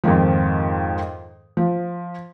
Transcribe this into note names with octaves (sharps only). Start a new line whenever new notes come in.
F2 G#2 D#3 F3
F3